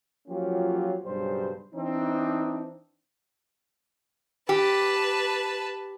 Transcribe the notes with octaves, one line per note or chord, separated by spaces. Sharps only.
F3 F#3 A#3 C#4 F4 G4
B1 G2 C#3 G3 C5
E3 C4 D4 D#4
G4 B4 A5